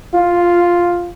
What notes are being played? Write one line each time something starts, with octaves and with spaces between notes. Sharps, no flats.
F4